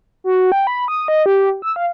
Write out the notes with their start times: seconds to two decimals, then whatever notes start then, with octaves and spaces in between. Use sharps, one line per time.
0.24 F#4
0.52 G5
0.67 B5
0.88 D#6
1.08 D#5
1.26 G4
1.62 E6
1.76 F5